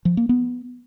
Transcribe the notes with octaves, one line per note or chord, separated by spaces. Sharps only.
F3
A#3
B3